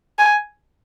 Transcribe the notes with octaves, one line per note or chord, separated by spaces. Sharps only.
G#5